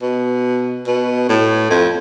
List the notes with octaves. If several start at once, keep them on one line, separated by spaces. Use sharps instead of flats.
B2
B2
A2
F2